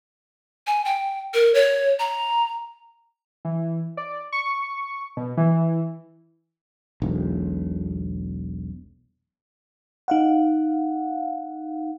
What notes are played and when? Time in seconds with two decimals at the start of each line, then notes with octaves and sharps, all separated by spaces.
0.67 G#5
0.85 G5
1.34 A#4
1.55 C#5
1.99 A#5
3.45 E3
3.97 D5
4.32 C#6
5.17 B2
5.37 E3
7.02 E1 B1
10.08 D#4 F5 F#5